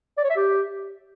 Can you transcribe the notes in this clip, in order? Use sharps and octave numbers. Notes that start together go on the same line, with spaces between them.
D5
C#5
E5
G4